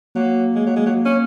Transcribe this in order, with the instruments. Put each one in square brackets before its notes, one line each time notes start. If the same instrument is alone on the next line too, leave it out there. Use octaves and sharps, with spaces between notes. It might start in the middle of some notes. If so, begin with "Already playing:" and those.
[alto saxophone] F#3 [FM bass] A#3
[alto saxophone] G#3
F#3
G#3
F#3
C#4